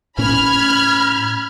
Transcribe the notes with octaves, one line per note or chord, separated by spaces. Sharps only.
A2 C#4 B5 F6 G#6